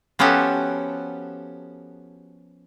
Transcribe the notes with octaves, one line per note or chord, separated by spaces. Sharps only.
F3 B3 C#4 F#4 G4 A4